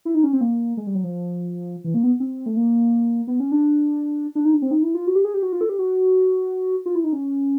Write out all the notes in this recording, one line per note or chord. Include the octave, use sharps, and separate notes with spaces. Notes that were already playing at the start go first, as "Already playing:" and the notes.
E4
D#4
C#4
C4
A#3
G#3
G3
F#3
F3
E3
A#3
B3
C4
A3
A#3
B3
C#4
D4
D4
D#4
D4
C4
D#4
E4
F4
F#4
G4
G#4
G4
F#4
F4
A4
G4
F#4
F4
E4
D#4
C#4